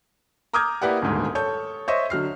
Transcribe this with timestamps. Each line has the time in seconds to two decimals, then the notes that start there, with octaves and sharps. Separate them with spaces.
0.53 A#5 D6 D#6 F6 G6 G#6
0.82 A#3 E4 G4 B4 D5 F#5
1.02 D#1 D2 G#2 A#3
1.35 A4 C#5 G6
1.88 C5 C#5 D#5 E5 C#6
2.10 D3 F#3 F6 C7